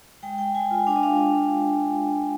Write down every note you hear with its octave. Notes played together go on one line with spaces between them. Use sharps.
G#3 G5
G#3 G5
G#3 G#5
F4 G#5
D4 G5
D#5
G#3 F5